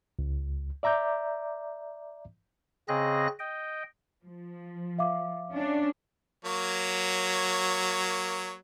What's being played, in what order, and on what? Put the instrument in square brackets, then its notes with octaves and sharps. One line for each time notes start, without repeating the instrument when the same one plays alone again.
[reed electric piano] C#2
D5 E5 A#5 D6 G6
[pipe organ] C#3 C4 G#4 D#5 F#6 A#6
D#5 G5
[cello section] F3
[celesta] E5 F5 D6
[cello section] C#4 D4
[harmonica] F#3 A#3 C#5